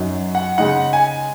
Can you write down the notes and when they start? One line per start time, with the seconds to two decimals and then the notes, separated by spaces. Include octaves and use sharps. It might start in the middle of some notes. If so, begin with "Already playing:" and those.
Already playing: F#2 F#3 D#4
0.35 F#5
0.58 C#3 G#3 D#4 F#5
0.93 G#5